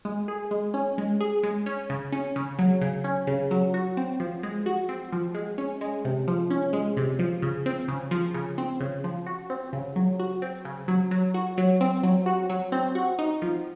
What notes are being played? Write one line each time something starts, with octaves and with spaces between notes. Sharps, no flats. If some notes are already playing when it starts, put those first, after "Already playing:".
G#3
G#4
G#3
C#4
G#3
G#4
G#3
C#4
C#3
C#4
C#3
F#3
C#3
C#4
C#3
F#3
F#4
C4
F3
G#3
F#4
C4
F3
G#3
C#4
G#3
C3
F3
C#4
G#3
C3
F3
C#3
C4
C#3
F3
C#3
C4
C#3
F3
F#4
C4
C#3
F#3
F#4
C4
C#3
F#3
F#3
F#4
F#3
C4
F#3
F#4
F#3
C4
F#4
D#4
F3